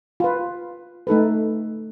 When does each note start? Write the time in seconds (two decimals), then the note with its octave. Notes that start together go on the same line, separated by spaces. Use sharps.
0.20 F4 B4
1.07 A3 D#4 A4 B4